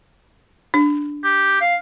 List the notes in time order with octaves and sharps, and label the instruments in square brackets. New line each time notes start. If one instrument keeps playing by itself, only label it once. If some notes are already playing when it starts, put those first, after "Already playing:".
[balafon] D4
[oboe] G4
F5